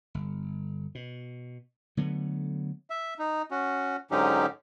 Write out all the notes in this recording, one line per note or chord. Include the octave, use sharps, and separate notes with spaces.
G1
B2
D3 F#3 A3 B3
E5
D#4
C#4 F#4
G#2 D3 F#3 C#4 D#4 G4